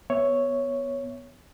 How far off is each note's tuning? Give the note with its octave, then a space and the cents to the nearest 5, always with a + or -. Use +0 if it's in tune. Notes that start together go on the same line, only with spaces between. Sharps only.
B3 +0 C#5 +0 E5 +0